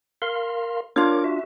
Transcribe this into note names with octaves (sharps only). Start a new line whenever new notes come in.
A#4 F5 C6
D4 F4 A#4 C#5 D6
F#4 E5